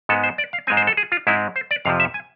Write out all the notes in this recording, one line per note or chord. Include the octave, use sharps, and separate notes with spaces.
G#2 G#3 B3 A4
C5
D5
F5
G#2 G#3 C4 G#5
C5
A4
G#4
F4
G#2 G#3 C4 E4
C5
D5
F2 C3 F3 F5
E5
G#5